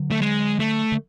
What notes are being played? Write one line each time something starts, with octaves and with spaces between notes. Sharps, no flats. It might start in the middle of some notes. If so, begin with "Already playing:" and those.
Already playing: D3 F#3
A3
G#3
A3
D3